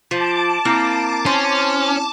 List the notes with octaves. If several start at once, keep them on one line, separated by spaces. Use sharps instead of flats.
F3 F4 A5 D6
A#3 C4 E4 G6
C#4 C5